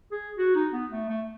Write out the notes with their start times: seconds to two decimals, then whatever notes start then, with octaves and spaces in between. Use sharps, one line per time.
0.12 G#4
0.38 F#4
0.55 D#4
0.73 B3
0.92 A3
1.09 A3